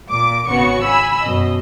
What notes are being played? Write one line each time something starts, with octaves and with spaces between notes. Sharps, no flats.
A#2 D6
G#1 C#3 B3 F#4 C#6
G#5 B5 E6
F#2 B2 D#5